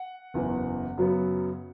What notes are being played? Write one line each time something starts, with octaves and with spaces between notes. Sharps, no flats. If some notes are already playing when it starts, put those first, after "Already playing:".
Already playing: F#5
F#1 E2 E3
F#2 C#3 F#3 B3